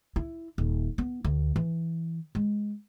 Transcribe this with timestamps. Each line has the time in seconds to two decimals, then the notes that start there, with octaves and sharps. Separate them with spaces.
0.16 E4
0.58 D#1
0.98 B3
1.24 D2
1.56 E3
2.35 G#3